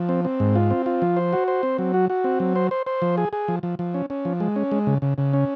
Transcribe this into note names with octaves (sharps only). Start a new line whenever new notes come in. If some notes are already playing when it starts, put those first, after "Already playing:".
Already playing: F3
C4
C4
G#2
F4
C4
F4
F3
C5
F#4
C5
C4
F#3
F#4
F#4
C4
F#3
C5
C5
C5
F3
G#4
G#4
F3
F3
F3
C#4
C#4
F3
G#3
C#4
G#3
C#3
C#3
C#3
C#4